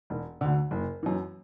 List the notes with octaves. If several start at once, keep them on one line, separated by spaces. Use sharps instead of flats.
E1
D2 D3
F#1
F#2 E3